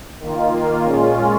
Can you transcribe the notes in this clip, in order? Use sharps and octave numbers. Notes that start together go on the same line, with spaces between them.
D#3 A#3 F4
A#2 G#3 C#4 F4